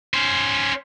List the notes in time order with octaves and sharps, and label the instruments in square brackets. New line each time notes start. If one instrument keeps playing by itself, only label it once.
[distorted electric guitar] C#4 C5